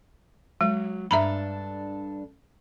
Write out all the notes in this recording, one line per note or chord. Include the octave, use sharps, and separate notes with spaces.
F#3 G#3
G2 D4 A4 E5 A#5 B5